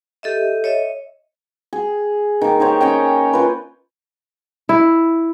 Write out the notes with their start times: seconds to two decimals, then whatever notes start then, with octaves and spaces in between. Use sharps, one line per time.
0.23 G4 A4 D#5 E5
0.64 C#5 D#5 E5
1.73 G#4
2.41 D#3 A#3
2.60 D#4 G4 C5 C#5
2.81 C#4 C#5 D#5 G5
3.33 F4 B4
4.69 E4